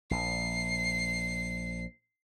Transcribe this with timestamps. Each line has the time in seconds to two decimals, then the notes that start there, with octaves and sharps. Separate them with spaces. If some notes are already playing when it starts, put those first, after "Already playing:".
0.11 A#1 C7